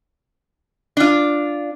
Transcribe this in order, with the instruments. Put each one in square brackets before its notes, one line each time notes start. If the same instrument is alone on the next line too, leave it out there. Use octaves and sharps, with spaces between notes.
[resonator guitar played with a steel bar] D4 F4